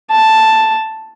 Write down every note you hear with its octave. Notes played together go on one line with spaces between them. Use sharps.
A5